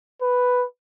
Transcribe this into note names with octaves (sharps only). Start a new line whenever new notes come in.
B4